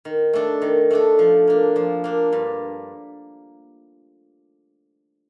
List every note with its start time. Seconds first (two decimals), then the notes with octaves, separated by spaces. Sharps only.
0.05 D#3
0.33 A3 D4 A4
0.62 D#3
0.91 A3 D4 A4
1.19 F3
1.47 A#3 D4
1.76 F3
2.04 A#3 D4
2.33 G2